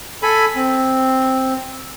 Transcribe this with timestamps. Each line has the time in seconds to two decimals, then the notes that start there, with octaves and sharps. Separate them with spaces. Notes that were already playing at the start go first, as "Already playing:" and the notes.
0.23 A4 G#5 B5
0.56 C4